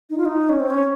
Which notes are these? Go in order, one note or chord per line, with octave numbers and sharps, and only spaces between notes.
D#4
F4
D#4
C#4
C4
C#4